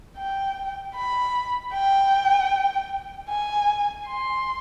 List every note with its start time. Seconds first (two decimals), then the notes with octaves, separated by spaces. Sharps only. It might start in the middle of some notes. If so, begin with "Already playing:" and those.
0.17 G5
0.95 B5
1.73 G5
3.29 G#5
4.07 C6